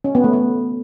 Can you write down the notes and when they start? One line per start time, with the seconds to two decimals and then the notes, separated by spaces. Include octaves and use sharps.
0.04 C#4
0.15 B3
0.24 A3
0.33 B3